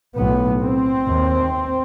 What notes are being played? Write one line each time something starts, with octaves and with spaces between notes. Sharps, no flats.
B1 A2 B3
C4
D#2